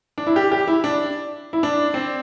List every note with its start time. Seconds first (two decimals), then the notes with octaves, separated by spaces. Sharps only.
0.18 D4
0.27 E4
0.36 G4
0.52 G4
0.68 E4
0.84 D4
1.53 E4
1.63 D4
1.94 C4